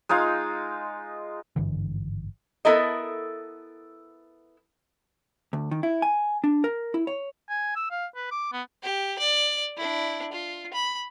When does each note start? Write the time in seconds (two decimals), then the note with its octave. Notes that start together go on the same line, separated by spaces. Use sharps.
0.09 G#3 D#4 F4 F5
1.56 G#1 G2 D3 E3
2.65 B3 E4 A4 A#4 D#5
5.53 D2
5.71 D#3
5.83 E4
6.02 G#5
6.44 D4
6.64 A#4
6.94 E4
7.07 C#5
7.49 G#5
7.76 E6
7.91 F5
8.16 B4
8.31 D6
8.53 B3
8.83 G4
9.18 D5
9.77 D4 E4
10.32 F4
10.73 B5